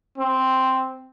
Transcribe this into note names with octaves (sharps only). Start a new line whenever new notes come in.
C4